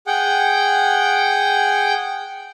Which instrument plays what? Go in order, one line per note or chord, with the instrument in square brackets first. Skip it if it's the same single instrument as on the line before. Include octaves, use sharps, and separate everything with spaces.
[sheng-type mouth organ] G#4 F#5 G5